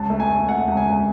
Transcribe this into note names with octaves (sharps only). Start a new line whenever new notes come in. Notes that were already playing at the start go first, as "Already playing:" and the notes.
Already playing: C#2 A5
A3
G#5
A3
A3 F#5
C#2
G#5
C#2